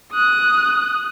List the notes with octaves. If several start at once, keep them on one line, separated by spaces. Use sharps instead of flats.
D#6 F#6